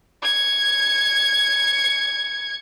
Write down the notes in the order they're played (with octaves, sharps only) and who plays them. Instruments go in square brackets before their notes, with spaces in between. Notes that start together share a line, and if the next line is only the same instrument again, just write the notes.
[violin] G#6 C#7